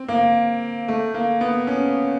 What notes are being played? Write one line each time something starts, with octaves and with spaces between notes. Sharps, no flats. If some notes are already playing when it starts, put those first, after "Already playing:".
Already playing: C4
A#3
A3
A#3
B3
C#4